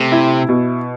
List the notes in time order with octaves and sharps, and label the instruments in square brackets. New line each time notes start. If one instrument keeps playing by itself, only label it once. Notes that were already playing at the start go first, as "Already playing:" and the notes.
Already playing: [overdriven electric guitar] C3 [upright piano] A3
[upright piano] E4
B2